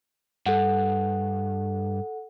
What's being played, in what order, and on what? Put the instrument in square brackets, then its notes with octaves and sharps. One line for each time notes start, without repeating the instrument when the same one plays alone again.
[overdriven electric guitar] G2 [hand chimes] A4 F#5